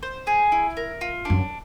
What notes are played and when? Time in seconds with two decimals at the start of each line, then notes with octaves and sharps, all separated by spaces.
0.03 C5
0.27 G#4
0.52 E4
0.77 A#4
1.01 F4
1.25 F#2 D4